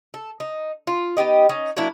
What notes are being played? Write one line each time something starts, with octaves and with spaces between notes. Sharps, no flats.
A4
D#4
F4
B3 D#4 G4 D#5
C#4 D#4
F#3 A#3 D4 E4